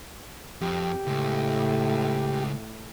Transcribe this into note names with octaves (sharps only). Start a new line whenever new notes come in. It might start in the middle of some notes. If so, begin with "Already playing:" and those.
F2 G4
C#2 A2